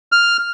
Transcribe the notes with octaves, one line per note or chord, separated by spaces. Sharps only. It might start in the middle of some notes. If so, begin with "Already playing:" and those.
F6